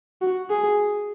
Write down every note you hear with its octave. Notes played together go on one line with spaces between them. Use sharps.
F#4
G#4